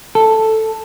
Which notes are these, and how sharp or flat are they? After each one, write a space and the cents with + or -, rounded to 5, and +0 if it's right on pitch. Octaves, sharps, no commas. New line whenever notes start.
A4 +5